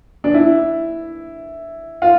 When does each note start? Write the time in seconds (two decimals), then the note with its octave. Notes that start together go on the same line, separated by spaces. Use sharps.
0.24 D4
0.34 E4
2.02 F4